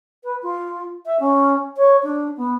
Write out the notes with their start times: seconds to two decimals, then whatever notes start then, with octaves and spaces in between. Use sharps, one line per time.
0.24 B4
0.43 F4
1.06 E5
1.20 C#4
1.77 C#5
2.03 D4
2.37 B3